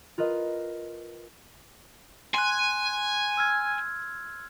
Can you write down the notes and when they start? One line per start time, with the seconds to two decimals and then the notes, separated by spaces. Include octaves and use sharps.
0.18 F4 A#4 B4 D#5
2.34 G#5 C6 F#6
3.37 E6 F6 G#6